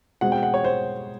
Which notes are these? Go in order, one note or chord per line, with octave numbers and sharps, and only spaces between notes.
B2 G#3 C4 F#5
G5
F#5
C#5
C5